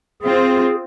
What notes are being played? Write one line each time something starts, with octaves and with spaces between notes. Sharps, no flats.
C4 F4 G#4